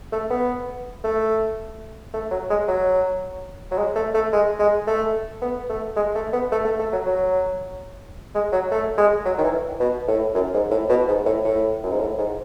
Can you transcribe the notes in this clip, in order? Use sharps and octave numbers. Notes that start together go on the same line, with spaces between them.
A3
B3
A3
A3
F#3
G#3
F#3
F#3
G#3
A3
A3
G#3
G#3
A3
B3
A3
G#3
A3
B3
A3
A3
A3
F#3
F#3
G#3
F#3
A3
G#3
F#3
D#3
E3
B2
A2
F#2
G#2
A2
B2
G#2
A2
A2
F#2
G#2
A2
G#2